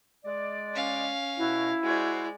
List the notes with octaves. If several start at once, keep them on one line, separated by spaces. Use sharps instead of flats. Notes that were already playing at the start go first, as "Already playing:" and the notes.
G#3 D5
C#4 F5
B2 E4 F#4
G#3 F#4 C5 D5